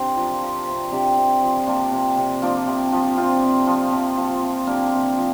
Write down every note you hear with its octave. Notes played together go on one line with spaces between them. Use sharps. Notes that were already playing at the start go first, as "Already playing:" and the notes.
Already playing: C3 C4 D4 G4 C5
F3 F4 A#4
F3
C3
C3 D4 G4
C3
F3
C3 A#3 D4
C3
C3
F3 A#3 D4
C3
F3
C3 C4 F4
C3
F3
C3
F3
C3
C3 A#3 D4
C3
F3